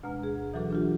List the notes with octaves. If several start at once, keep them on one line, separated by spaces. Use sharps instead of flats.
D2 B2 G#3 A#5 F6
G#4
B2 E3 F#3 F#4 A4 D6
D4 F4 G4